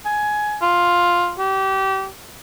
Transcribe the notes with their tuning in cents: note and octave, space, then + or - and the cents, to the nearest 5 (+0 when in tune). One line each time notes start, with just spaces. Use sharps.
G#5 +15
F4 +5
G4 -30